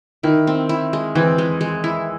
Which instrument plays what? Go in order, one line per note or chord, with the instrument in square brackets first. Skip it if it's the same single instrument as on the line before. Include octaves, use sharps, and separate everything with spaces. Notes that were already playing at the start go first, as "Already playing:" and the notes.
[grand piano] D#3 [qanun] E4
[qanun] C4
E4
G#3
[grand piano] E3 [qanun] C4
[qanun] G#3
G#3
E4